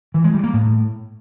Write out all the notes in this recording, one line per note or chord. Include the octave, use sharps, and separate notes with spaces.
E3
G#3
G3
A#3
A2